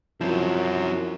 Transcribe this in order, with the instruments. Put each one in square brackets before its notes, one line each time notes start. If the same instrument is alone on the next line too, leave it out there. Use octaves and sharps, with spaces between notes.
[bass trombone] F#2 [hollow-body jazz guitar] F3 [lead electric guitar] C4 E4